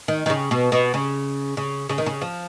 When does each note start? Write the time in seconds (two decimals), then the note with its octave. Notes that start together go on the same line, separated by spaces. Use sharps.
0.08 D#3
0.26 D#3
0.30 C#3
0.51 B2
0.72 B2
0.94 C#3
1.57 C#3
1.89 C#3
1.98 D#3
2.06 C#3
2.22 F3